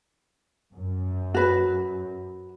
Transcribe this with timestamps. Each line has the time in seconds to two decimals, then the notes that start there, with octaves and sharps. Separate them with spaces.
0.74 F#2
1.34 F#4 B4